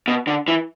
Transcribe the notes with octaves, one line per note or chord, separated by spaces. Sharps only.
B2
D3
E3